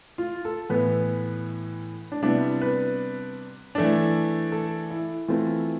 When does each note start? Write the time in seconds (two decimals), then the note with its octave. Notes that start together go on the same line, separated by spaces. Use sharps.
0.18 F4
0.45 A4
0.69 A2 E3 B3 B4
2.12 D4
2.23 C3 G3 B3 D4 E4
2.62 B4
3.75 E3 A3 D4
4.52 A4
4.90 E4
5.28 E3 A3 C4 F4